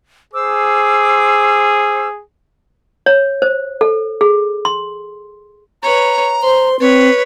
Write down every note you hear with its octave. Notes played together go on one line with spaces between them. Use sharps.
G#4 C5 D6 E6
C#5
C5
A4
G#4
C6
B4 C#5 A#5
C5 C6
C4 B4 C#5